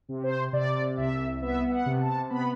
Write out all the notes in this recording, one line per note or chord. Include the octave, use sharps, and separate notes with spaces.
C3
C5
C3 D5
C2 E5
B3 E5
F#5
C3
A5
B3 B5